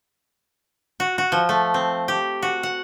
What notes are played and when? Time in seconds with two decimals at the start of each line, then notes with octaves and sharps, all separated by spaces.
1.00 F#4
1.18 F#4
1.32 F3
1.49 A3
1.74 C4
2.08 G4
2.42 F#4
2.63 F#5